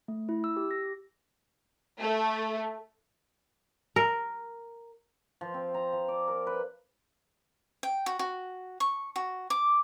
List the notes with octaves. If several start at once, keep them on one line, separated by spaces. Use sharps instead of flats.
A3
E4
E6
G4
A#6
A3
A#4
F3
C4
A#5
F3
D5
A#4
B4
G5
F#4
F#4
C#6
F#4
D6